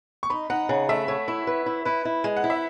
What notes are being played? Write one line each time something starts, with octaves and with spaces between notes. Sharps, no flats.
C#6
D#4 B5
D#4 F#5
C#3 F#5
A3 E5
A3 C#5
E4
B4
E4
E4 B4
E4
G#3
F#5
E4
E5